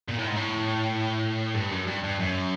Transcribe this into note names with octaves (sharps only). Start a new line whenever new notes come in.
A#2
A2
G#2
A2
G2
F#2
G2
G2
F#2